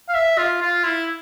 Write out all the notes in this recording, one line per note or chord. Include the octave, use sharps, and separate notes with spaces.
F5
E5
F4
F4
E4